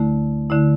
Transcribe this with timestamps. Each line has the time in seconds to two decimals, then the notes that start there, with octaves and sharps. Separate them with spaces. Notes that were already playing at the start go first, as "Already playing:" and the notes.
Already playing: D2 D3 A3 E4
0.50 D3 A3 E4